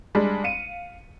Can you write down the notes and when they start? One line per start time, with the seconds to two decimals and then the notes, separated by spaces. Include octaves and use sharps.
0.15 G3 G#3 D4
0.44 F5 C#7 D#7